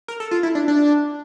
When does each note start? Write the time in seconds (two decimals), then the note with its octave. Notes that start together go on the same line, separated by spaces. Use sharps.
0.08 A#4
0.20 A4
0.31 F4
0.43 E4
0.55 D4
0.68 D4